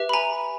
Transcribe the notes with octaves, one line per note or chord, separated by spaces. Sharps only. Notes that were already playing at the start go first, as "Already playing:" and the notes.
Already playing: G4 B4 E5
B5
G#5 A#5